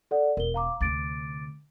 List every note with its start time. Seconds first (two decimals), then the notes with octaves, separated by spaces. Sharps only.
0.11 A4 D5 F#5
0.37 E1 A#4 G7
0.54 F5 A#5 D6
0.81 D2 C3 D6 A6 D7